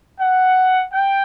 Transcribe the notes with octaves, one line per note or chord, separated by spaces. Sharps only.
F#5
G5